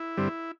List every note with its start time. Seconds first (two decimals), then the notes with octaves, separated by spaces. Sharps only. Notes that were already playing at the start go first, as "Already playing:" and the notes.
Already playing: E4
0.17 G2 D3 G3 C4